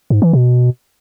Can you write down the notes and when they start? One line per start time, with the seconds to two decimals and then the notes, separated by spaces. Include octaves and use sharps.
0.10 G#2
0.22 E3
0.33 B2